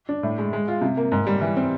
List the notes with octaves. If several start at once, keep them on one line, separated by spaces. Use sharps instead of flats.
D4
A2
G#3
G#3
F4
C3
A#3
G#2
G3
E3
C4